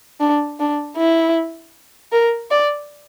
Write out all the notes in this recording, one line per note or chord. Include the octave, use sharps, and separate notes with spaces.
D4
D4
E4
A#4
D5